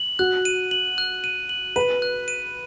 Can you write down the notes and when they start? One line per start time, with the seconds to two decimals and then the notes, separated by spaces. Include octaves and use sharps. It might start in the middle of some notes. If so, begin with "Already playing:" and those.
Already playing: F#7
0.19 F#4 F#6
0.45 D#7
0.71 F#7
0.98 F#6
1.24 D#7
1.49 F#7
1.76 B4 D#7
2.02 F#6
2.28 D#7